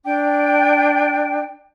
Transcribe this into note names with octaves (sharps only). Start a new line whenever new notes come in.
D4 G5